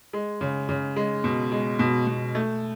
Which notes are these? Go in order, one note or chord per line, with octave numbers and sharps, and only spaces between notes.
G#3
C#3
C#3
G#3
B2
G#3
B2
B2
A3